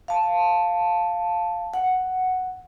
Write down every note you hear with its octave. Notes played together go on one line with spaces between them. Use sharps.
F5 A5
F#5